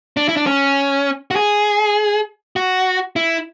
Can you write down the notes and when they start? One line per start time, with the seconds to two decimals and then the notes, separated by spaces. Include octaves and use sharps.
0.17 D4
0.29 E4
0.37 D4
0.47 C#4
1.31 F#4
1.36 G#4
2.56 F#4
3.16 E4